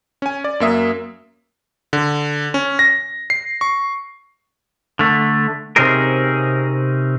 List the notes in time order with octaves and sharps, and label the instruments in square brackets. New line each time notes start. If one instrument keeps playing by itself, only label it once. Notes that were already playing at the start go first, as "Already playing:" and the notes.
[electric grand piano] C#4 G#5
D5
F#2 A#3 E5 D#6
D3
C#4
A#6
C7
C#6
[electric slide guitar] D3 A3
C3 C4 C#4 D#4 G#4 A#4